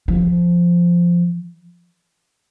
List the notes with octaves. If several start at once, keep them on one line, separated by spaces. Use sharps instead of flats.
F3